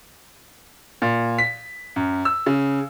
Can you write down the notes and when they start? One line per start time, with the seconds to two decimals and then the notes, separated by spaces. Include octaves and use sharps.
1.02 A#2
1.38 B6
1.96 F#2
2.25 E6
2.46 C#3